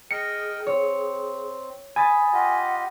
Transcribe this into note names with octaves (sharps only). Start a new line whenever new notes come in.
G#4 A#4 D#5 G5 C#7
C4 C#5
G#5 B5 D#6 A6
F4 G4 D#5 F#5